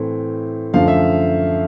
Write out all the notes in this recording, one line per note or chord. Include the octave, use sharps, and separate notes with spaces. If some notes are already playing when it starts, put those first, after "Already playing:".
Already playing: A2 E3 A3 C4
F#2 D3 F3 A3 F5
E5